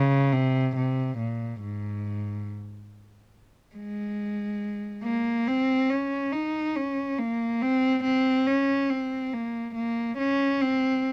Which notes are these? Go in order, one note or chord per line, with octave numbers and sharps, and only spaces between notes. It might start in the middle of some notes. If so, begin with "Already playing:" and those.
Already playing: C#3
C3
C3
A#2
G#2
G#3
A#3
C4
C#4
D#4
C#4
A#3
C4
C4
C#4
C4
A#3
A#3
C#4
C4